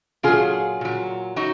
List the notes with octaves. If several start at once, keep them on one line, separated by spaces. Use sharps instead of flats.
A#2 F#3 F4 G#4
A#2 F#3
F#3 D#4 F#4